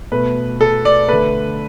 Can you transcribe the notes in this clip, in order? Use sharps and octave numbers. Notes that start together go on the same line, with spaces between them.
B2 A3 B4
A4
D5
D3 A3 B4